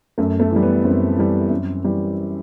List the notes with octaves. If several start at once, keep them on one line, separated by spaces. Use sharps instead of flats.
F#2 A3
A3
E3
G3
B3
F#2 C4
E3 G3
F#2
E3 G3